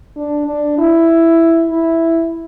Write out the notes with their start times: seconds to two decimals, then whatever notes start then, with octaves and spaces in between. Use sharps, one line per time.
0.16 D4
0.47 D4
0.78 E4
1.70 E4